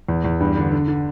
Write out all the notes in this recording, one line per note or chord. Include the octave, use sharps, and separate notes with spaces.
E2
E2
G2
D3
D3
D3